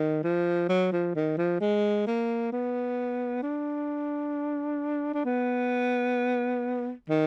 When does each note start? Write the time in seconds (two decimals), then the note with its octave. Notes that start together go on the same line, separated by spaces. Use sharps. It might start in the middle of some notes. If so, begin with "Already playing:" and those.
Already playing: D#3
0.24 F3
0.69 F#3
0.92 F3
1.15 D#3
1.38 F3
1.61 G#3
2.07 A#3
2.52 B3
3.43 D4
5.14 D4
5.25 B3
7.09 D#3